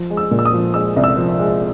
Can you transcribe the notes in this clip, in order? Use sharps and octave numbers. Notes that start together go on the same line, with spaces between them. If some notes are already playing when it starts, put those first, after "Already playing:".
Already playing: F3
G#3
E6
A#2
E6
D#6
F3
G#3 E6
C2
E6
F3
G#3